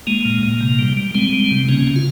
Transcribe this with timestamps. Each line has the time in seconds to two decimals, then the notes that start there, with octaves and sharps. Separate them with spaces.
0.07 G#3 A#3
0.25 A#2
0.43 A#2
0.61 C3
0.79 G3
0.97 G3
1.15 G3 G#3 C4
1.33 G3
1.51 C3
1.68 C#3 A#3 C#4
1.87 C#3
1.96 F4